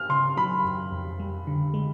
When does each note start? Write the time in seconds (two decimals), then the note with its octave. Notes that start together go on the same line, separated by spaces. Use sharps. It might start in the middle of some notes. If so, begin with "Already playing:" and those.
Already playing: F6
0.09 C#3 C6
0.37 F#3 B5
0.64 F#2
0.91 F2
1.20 G3
1.47 D3
1.74 G#3